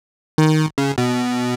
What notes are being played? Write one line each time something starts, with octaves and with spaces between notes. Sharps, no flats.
D#3
C#3
B2